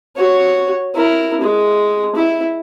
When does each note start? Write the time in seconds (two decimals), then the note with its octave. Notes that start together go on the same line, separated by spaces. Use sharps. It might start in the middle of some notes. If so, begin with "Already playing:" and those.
0.16 F#4 C#5
0.94 E4 A#4
1.41 G#3
2.15 E4